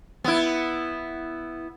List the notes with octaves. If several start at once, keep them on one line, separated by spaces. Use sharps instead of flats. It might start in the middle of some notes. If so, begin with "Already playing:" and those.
B3 E4